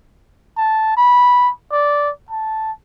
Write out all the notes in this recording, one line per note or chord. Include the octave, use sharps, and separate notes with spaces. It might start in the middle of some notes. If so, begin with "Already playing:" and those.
A5
B5
D5
A5